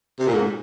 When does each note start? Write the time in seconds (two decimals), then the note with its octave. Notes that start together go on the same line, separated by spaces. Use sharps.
0.19 C3
0.27 A#2
0.34 G#2